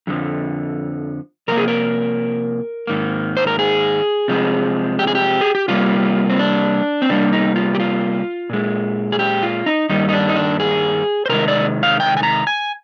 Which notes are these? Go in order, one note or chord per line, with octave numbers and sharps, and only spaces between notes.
F2 D3 F3
C3 F3 A#3 A#4
G#4
A#4
G#2 D#3 A#3
C5
A#4
G#4
C3 F3 G#3
G4
G#4
G4
G#4
G4
C3 G3 A#3 F4
C4
D4
C4
C3 G3 A#3 D4
D#4
F4
G4
F4
A#2 G#3
G#4
G4
F4
D#4
G2 D#3 G3 A#3 D#4
D#4
D4
D#4
D4
G#4
C5
C3 D#3 G#3 A#4
D5
F5
G5
G#5
A#5
G#5